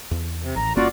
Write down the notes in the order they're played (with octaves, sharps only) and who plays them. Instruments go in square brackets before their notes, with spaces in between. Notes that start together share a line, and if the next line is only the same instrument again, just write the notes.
[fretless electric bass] E2
[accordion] C3
[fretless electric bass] A1 [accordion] A#5
[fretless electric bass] G1 A#3 C#4 [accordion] F4 F#4 D5